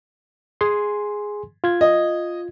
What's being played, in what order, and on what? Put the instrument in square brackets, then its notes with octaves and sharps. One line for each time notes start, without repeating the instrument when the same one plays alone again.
[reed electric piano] G#4 G#5 C6
F4 G#6
[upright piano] D#5